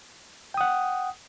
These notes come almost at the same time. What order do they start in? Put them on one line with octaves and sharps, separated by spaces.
G5 D#6 F#5